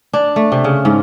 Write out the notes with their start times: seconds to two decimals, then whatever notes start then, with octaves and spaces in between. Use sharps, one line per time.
0.13 D4
0.36 A3
0.52 C3
0.64 C#3
0.85 G#2